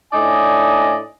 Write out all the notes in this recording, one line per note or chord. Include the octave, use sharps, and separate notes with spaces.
A2 D4 D#4 D5 D#5 G#5